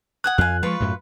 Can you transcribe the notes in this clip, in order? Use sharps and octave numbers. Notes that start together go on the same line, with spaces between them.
F#5 G#5 D#6 F#6
F2 F5 G#5 F#6
F3 G#3 F4 B4 C#6
F#2 A2